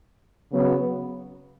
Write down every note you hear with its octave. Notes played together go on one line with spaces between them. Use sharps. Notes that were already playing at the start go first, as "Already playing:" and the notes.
C#3 F#3 B3